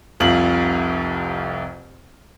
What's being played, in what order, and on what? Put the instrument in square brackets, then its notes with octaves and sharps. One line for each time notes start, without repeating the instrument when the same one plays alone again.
[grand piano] F1 C2 F2 F4 F#7